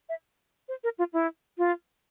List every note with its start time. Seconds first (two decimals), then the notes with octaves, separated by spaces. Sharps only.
0.09 E5
0.68 C5
0.83 A#4
0.98 F4
1.13 E4
1.58 F4